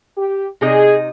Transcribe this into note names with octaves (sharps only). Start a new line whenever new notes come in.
G4
C3 D#4 G#4 D#5